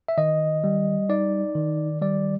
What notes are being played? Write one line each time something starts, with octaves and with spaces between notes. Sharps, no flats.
E5
D#3 D#5
G3
D#4 D5
D#3
G3 D5